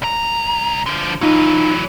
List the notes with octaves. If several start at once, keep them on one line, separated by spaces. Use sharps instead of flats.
C2 A#5
D3 F3
E3 F#3 D#4 F4